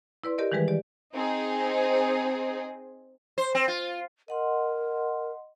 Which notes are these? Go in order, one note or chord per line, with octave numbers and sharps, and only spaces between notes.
E4 B4 D5 C6
G4 A#4 D5 D#5
D#3 E3 G3 G#3 G#4 B4
G4 D5
C4 D#4 G#4
C5
C4
F4
A#4 D#5 F#5 C6